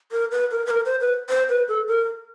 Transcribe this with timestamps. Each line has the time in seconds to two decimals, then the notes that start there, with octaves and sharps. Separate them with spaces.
0.12 A#4
0.31 B4
0.51 A#4
0.66 B4
0.71 A#4
0.85 C5
1.01 B4
1.29 C5
1.49 B4
1.68 A4
1.88 A#4